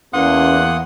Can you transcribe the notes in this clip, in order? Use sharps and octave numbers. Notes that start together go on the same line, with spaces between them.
E2 A#3 C#4 F#5 C6 D#6